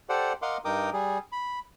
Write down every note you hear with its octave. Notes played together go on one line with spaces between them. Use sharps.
G4 A4 C5 D5 F#5
A#4 D#5 F5 F#5 C6 D6
G2 D#4 A#4 G5 D6 D#6
G3 G#4
B5